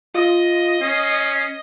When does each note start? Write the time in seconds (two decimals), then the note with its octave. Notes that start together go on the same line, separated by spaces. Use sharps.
0.14 F4 D#5
0.81 C#4 C7